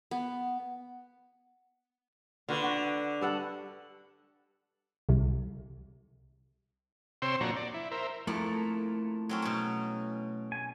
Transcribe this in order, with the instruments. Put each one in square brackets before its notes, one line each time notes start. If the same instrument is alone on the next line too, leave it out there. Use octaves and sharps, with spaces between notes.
[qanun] B3
[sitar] D3 [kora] F4 F#4 B4
[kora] F#4
G2 A4 F#5
[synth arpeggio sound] C2 C3
[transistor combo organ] C3 C5 C#5 G5 C6 E6
A#2 F3 D4 F#4 C#5 A#5
D5
E4
A#4 C5 E5
[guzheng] F2 A#3 [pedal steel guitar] A3 E4 A#5
[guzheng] F#3 C4 C#4
B2 C#4
[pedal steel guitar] G#5